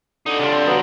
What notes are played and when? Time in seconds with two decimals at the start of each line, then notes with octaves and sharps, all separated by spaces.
0.26 D3 D#4 D5
0.39 C#3 G3 D4 F4
0.52 C4
0.67 F#3 B3